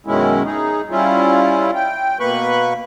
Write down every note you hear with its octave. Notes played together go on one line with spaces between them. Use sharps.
F#2 B2 D#3 G#3 C#4 E4
D#4 G#4
G3 C#4 E4 F4
G5
B2 A#3 B4 B5 C#6 F#6